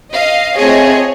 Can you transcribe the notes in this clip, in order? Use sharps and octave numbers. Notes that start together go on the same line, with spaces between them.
D#5 F5
A3 C4 F4 G#4 C#5 D#5